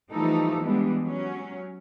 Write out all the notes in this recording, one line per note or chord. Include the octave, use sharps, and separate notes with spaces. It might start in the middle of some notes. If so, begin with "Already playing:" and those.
E3 F3 G3 A3 D#4 A4
E3 G3 G#3 B3 D4
F#3 C#4